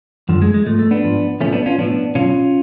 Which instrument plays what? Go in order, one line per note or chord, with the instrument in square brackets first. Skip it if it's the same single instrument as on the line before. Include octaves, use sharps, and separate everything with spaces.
[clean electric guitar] F#2 D3 F3
G#3
G#3
G#2 F3 A3
A3
B3 D4
G#2 F3
B1 A2 F3 A3 C#4
B3 D4
C#4 F4
B1 A2 F3 B3 D4
B1 B2 F#3 C#4 F4